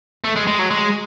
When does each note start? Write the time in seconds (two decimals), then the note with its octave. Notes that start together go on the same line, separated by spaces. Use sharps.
0.24 A3
0.36 G#3
0.48 G#3
0.59 F#3
0.71 G#3